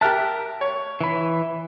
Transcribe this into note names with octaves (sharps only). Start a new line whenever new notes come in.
G4 A#4 E5 A5 F#6
C#5
E3 B5